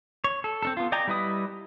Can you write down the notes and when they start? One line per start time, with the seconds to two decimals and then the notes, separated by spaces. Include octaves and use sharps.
0.24 C#5
0.44 A4
0.63 C4 D4 A4
0.77 B3 F4
0.92 D5 D#5 G5 G#5 A#5
1.07 G3 E4 B4 D#5 D#6